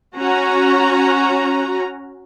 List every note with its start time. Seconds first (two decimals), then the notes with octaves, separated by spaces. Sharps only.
0.18 C#4 F#4 A#5